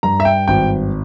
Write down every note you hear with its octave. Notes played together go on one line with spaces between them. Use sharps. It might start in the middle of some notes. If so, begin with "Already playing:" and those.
G2 A#5
E5
G5
G#1 G5